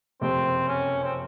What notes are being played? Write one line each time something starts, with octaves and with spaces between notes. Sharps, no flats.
F#1 F2 C3 C4
C#4
C4